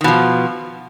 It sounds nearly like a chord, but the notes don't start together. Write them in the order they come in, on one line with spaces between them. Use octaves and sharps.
D#3 B2 F3